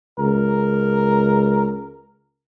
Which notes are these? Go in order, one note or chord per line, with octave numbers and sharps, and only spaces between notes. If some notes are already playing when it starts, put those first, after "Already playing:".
C#2 A#4